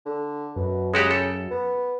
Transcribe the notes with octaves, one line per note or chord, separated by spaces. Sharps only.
D3
F#2 B2
C#3 G#3 F#4 G4
A4
B3